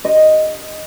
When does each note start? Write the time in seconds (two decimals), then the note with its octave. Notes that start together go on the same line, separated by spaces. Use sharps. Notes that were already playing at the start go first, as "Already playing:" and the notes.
0.05 D#5